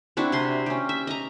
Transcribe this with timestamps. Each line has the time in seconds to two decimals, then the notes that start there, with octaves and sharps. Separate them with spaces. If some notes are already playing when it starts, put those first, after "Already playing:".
0.17 C4 D4 E4 F#4
0.32 C3 G#5 C6
0.66 C#4 G4
0.89 E5
1.07 D#5 A#5